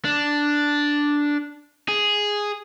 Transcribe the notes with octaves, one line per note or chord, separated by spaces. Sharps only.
D4
G#4